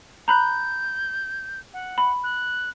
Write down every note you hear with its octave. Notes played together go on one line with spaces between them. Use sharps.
A#5 B5 F#6 G6
F#5
B5
F#6